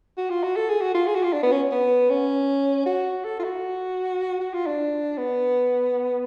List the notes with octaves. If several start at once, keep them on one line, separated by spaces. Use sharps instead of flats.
F#4
F4
F#4
A4
G#4
F#4
F4
G#4
F#4
F4
D4
B3
C#4
B3
C#4
F#4
A4
F4
F#4
F#4
F4
D4
B3